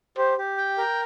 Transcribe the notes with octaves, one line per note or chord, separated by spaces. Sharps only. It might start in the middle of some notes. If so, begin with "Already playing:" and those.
G4 C5
G4
G5
A#4